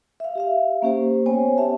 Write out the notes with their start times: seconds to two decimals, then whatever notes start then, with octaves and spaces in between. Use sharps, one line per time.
0.20 E5 F5
0.35 G4 E5 F5
0.82 A#3 C#4 G4 C5
1.26 B3 C5 C#5 G5 G#5
1.57 C#4 G4 E5 A5